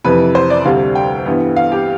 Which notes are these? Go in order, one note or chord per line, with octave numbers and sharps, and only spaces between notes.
F2 C3 E3 B4
C5
D5
D2 C3 G3 C4 F5
G5
G2 E3 B3
F5
G4